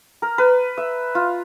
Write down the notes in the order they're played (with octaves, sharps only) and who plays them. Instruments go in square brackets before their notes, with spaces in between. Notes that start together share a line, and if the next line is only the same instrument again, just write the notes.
[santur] A#4
B4
E5
F4